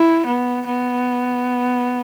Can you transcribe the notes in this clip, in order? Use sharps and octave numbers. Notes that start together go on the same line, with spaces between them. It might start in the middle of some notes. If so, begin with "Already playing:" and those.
Already playing: E4
B3
B3